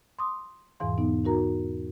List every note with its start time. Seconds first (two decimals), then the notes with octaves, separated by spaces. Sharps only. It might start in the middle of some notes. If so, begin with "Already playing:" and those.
0.19 C6 D6 D#6
0.80 E2 G#2 B2 E3 F5 C6
0.98 B3 D#4
1.25 D#4 F#4 A#4 A#5